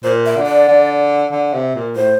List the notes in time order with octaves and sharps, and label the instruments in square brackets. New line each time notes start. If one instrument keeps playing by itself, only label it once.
[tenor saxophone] A#2 [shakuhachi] C5
[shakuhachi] E5
[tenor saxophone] D3
[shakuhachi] D5
[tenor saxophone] D3
D3
C3
A#2
[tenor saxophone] A2 [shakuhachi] C5